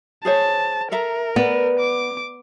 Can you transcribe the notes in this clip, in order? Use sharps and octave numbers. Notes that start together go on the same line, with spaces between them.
G#4 C5 C#5 A5
A4 A#4 E5 A#5
B3 D5
D6